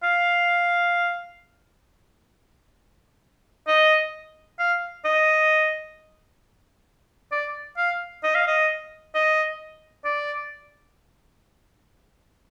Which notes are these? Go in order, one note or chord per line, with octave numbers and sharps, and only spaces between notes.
F5
D#5
F5
D#5
D5
F5
D#5
F5
D#5
D#5
D5